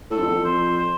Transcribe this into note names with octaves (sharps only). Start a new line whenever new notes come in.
A2 A4
F2
E2
F2
C5
C5